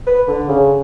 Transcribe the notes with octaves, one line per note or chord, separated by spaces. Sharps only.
B4
D3
C#3